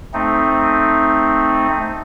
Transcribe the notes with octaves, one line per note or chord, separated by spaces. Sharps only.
A3 C4 D#4